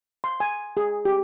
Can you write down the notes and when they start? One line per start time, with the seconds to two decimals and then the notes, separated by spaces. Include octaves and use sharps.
0.24 C6
0.40 G#5
0.77 G#4
1.05 G4